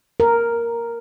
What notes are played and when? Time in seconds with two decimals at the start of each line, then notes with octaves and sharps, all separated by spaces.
0.20 A#4